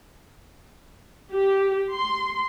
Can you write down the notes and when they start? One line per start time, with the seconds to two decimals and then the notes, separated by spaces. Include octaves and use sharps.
1.32 G4
1.94 C6